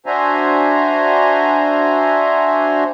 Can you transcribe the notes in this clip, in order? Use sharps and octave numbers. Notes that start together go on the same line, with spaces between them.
D4 F#4 C5 E5 G#5 A#5